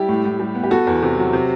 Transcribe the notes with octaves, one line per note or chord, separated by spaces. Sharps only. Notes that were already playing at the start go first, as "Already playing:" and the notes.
Already playing: G3 E4 G4
A2
A2
G3
B3
G4
B3 F#4 A4
E2
C3
F#3
C3